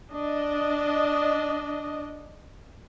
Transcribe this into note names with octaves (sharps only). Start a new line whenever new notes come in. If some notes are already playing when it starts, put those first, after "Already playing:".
D4 D#5